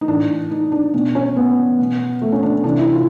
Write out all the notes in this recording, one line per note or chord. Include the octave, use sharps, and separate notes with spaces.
D#4
A2 E3 D4
D#4
D4
B2 D4
C#4
B3
B2
A3
C#4
D4
C3 E3 D4
E4
F4